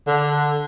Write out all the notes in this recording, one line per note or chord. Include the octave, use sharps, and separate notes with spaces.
D3